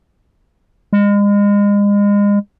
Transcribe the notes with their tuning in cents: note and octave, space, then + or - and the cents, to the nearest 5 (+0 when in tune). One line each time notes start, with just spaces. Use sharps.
G#3 -35